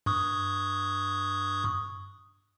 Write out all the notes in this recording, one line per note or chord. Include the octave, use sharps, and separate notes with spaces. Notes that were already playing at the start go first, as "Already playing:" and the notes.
G2 C#6 D#6